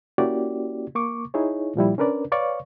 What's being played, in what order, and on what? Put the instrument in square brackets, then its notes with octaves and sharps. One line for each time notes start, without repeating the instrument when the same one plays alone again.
[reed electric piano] A#3 C#4 E4 F#4 G4 D5
A#3 C#6 D6
D#4 E4 G#4 C#5
A#2 F3 G3 E4
C#4 D4 A#4 B4 D5
B4 C#5 D5 F5 C#6